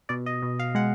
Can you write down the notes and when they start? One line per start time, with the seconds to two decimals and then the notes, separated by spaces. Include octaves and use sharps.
0.09 B2 D5
0.26 D#5
0.42 B2
0.59 F5
0.75 G#3 F#5